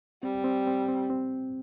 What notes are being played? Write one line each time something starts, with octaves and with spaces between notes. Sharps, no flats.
G3 C4
C4
C4
C4
C4